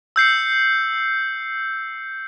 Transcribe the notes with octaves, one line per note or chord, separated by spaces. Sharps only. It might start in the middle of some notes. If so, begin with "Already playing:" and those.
E6 G6 C7 C#7